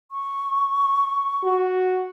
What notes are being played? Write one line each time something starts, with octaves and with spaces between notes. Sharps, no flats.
C#6
F#4